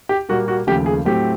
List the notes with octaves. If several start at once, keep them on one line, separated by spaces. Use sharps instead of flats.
G4
A#2 G3 A#3 F#4
F#4
D#2 C#3 F3 A3 G4
G#4
A2 F#3 A3 C4 G4